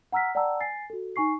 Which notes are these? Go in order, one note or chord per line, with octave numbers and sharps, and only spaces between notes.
F#5 A#5 E6 F6 B6
D5 F#5 G5 A5 A#5 E6
G#5 A6 C7
F#4 A4
D#4 G#5 C#6 C7